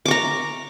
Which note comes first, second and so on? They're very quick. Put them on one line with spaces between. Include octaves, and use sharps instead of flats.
D6 C#6 A#5